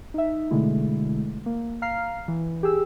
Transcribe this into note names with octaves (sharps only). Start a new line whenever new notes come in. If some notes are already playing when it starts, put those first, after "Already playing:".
D#4 E5
B2 D3 G#3 A3 E4
A#3
F5 A#5 F6 C7
E3
G4 G#4 E6